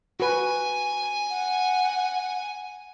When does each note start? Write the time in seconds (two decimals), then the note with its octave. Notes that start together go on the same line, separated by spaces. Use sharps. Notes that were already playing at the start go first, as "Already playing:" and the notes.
0.20 F#4 B4 G#5
1.30 F#5